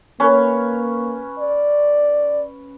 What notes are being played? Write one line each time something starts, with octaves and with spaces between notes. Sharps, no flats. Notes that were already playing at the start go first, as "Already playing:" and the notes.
A#3 C#4 B4
D5